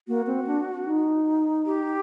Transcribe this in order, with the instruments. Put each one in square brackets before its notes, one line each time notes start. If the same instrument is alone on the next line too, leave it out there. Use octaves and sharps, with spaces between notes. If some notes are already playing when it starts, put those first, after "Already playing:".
[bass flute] A#3 [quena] F#4
[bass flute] C4
D4
D#4
[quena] G4